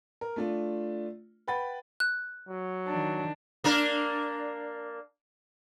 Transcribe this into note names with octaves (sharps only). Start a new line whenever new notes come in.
A#4
A3 D4 F4
B4 F#5 G5 B5 A6
F#6
F#3
D#3 D4
A#3 D4 A#4